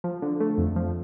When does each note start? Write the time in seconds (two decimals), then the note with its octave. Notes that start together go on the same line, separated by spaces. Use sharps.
0.04 F3
0.22 D3
0.40 A3
0.58 F2
0.76 F3